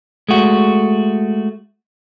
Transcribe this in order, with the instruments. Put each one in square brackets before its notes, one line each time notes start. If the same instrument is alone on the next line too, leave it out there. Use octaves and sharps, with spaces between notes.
[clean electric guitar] G#3 A3 F#4